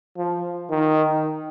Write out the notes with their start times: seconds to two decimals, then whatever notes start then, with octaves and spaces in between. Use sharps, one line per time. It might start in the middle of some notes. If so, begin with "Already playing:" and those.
0.18 F3
0.71 D#3